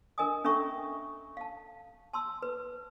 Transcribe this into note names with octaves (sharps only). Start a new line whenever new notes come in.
D4 A#4 D#5 G#5 D#6
C#4 D4 A4 E5 A#5 C#6
F5 A5
A5 C6 E6
B4